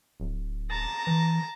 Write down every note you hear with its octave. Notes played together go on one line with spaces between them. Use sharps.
D1
A5 A#5
E3